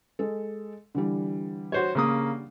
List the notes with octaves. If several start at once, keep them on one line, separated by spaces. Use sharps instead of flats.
G#3 A4
D3 E3 G3
F#4 C5 C#5
C#3 A#3 D#6